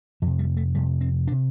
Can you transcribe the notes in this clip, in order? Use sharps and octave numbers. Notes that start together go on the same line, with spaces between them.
F2 C3 F3
G3
A3
F2 C3 G3
C4
D4
C3